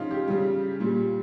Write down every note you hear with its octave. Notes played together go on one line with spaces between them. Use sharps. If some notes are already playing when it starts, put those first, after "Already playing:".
Already playing: C#3 F3 D#4 F4
G4
C#3 G3
A#2 G3